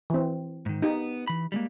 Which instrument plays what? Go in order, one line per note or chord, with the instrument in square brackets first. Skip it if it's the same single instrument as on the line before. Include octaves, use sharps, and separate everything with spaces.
[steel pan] E3 C4
[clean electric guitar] G#2 D#3
[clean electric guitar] B3 [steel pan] D#4 G4
[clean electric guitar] E3 B5
G3 G#3 A#3